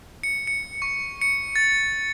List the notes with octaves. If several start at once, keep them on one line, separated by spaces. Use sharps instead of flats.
C#7
C#7
C#6
C#7
A6